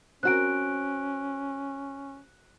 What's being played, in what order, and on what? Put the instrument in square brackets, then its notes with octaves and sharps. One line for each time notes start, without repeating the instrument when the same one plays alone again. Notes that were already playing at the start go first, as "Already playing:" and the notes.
[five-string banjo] C4 F#4 A#4 [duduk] C#4 [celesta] F#6 D7